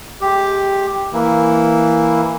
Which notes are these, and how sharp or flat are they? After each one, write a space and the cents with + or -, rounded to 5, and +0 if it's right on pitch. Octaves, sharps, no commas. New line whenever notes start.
G#3 +40 G4 +5
E3 +0 A#3 +0 E4 +0